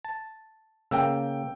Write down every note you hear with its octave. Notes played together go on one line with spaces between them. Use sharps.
A5
C#3 A#3 G5 E6